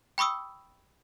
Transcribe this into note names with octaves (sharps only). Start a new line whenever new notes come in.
G5 B5 C#6 D#6 E6